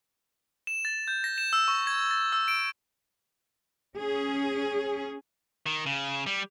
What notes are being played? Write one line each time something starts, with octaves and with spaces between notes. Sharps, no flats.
E7
A6
G6
A#6
E7
E6
C#6
G#6
A6
E6
D7
C#4 G#4
D#3
C#3
G3